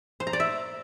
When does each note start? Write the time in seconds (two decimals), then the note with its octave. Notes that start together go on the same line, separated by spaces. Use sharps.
0.20 C5
0.27 A#5
0.33 D5
0.40 E5